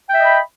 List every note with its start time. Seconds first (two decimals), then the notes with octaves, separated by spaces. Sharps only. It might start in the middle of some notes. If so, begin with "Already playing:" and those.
0.09 G5
0.14 E5
0.19 D#5
0.23 B5